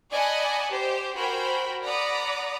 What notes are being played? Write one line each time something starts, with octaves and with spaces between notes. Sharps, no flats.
D5 D#5 F#5 G#5 A5 B5
G4 C5
F#4 A#4 C5 G5 G#5 B5
D5 F#5 A#5 B5 D6 D#6